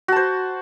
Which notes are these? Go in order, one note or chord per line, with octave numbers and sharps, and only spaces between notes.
F#4 C5 A5